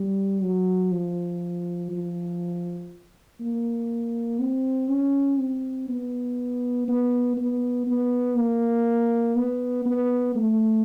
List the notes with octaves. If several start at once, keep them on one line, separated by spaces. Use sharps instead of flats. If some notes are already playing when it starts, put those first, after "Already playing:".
Already playing: G3
F#3
F3
F3
A#3
C4
C#4
C4
B3
B3
B3
B3
A#3
B3
B3
A3